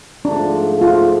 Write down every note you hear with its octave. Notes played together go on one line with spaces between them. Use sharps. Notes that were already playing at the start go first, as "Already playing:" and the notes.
G#2 F3 A3 D4
F4